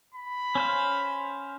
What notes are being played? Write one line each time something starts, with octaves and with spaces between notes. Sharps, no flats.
B5
C#4 C5 F5